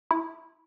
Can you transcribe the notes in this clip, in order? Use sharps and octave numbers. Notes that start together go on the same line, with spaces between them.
E4